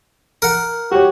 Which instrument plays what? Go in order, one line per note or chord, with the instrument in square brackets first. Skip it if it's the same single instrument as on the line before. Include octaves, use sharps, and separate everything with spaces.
[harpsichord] A#4 F#5
[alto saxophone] F#4 [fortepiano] G4 C#5